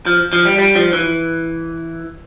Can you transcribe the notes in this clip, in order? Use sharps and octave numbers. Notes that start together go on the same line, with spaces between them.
F3
F3
G3
G3
F3
E3